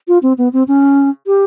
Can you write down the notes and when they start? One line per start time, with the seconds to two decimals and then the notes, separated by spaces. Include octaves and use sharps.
0.08 F4
0.23 C4
0.38 B3
0.53 C4
0.68 C#4
1.27 G4